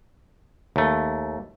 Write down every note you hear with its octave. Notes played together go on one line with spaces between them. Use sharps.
D#2 A3